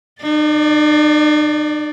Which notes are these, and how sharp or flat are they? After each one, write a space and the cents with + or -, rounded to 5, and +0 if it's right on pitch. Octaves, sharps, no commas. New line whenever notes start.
D#4 -45 D5 +0